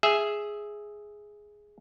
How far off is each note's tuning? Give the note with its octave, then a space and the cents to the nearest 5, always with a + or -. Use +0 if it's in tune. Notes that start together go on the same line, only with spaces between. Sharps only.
G#4 +0 E5 +0